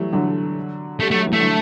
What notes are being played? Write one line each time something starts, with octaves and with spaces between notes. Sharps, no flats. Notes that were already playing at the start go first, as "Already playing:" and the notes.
Already playing: E3 F#3 G3 A3
D3 F#3
G3 A3
F#3 A3
E3
A3
D3 F#3